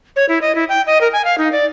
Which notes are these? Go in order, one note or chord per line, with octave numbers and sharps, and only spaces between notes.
C#5
E4
D#5
E4
G5
D#5
A#4
G#5
F5
D#4
D5